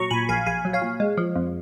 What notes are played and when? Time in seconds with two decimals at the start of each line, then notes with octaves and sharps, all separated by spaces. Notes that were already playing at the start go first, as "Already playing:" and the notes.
Already playing: A#2 F#3 A#5 C#6
0.10 A#2 G#5 B5
0.29 A#1 F5 G#5
0.46 A#1 F5 G#5
0.65 F#3
0.73 C#5 F5
0.82 A#2
1.00 G#3
1.17 F3
1.36 F2